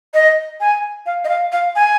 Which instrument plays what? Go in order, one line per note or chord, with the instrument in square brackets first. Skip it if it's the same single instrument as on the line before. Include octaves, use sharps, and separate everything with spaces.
[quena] D#5
G#5
F5
D#5
F5
F5
G#5